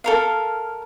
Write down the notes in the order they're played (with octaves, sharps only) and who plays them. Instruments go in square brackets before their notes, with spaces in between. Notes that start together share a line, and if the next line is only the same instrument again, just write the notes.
[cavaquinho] A4 A#4 F5